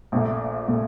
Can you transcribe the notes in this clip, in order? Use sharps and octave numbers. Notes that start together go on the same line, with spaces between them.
A#1 A#2 A3
A#2 A3